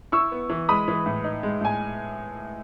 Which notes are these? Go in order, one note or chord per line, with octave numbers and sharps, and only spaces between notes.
E4 C#6 E6
B3
E3
G#3 B5 D#6
E3
A2
D#4
G#3
A2 G#5